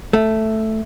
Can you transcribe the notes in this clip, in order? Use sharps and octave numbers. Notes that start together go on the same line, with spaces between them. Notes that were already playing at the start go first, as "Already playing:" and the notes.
A3